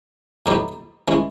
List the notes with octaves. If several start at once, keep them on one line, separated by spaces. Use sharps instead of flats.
A2 F#3 B3 D#4 G4
E3 G#3 C#4